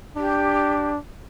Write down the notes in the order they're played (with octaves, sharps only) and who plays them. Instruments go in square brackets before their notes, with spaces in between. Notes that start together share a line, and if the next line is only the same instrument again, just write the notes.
[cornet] D4 [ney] G4